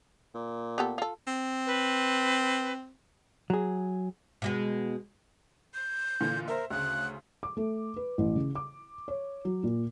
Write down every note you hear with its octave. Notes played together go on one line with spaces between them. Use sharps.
A#2
B3 G4 A4
F4 A4
C4
B4
F#3 G#4
B2 G#3 B3
G6
A#2 D3 E3
A#4 C5 E5
D2 C#3 F#6
D6
A3
B4
A1
C#3
D6
C#5
F#3
A#2